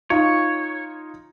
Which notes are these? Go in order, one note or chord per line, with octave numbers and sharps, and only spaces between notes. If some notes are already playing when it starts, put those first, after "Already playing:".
D#4 F4 C#5